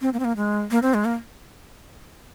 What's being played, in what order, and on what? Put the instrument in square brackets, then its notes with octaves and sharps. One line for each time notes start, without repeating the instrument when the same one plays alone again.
[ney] C4
A#3
C4
A#3
G#3
A#3
C4
G#3
A#3